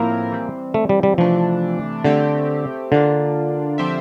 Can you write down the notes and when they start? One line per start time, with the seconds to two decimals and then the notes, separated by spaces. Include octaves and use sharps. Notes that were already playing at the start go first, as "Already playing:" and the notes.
Already playing: A2 F3 A#3 C4 E4 A#4
0.31 E3 G3 C4
0.74 A3
0.89 G3
1.03 G3
1.18 C3 E3 F3 A3 D4
2.04 D3 A3 C4 G4
2.92 D3 A#3 D4 F4
3.78 F3 C4 G4 C5 E5